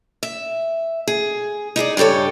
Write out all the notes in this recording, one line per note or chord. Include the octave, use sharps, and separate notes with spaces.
E5
G#4
D#4 E4 G#4 D5
G2 C#3 G4 A4 C#5